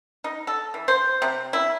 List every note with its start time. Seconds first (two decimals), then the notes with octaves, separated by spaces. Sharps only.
0.24 D#4
0.47 A4
0.74 E3
0.88 C5
1.22 C3
1.53 E4